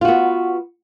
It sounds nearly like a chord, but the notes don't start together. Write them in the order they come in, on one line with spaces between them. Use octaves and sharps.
F4 F#4 B3